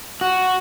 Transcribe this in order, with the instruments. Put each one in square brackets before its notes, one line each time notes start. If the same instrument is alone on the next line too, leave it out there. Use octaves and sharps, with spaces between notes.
[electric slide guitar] F#4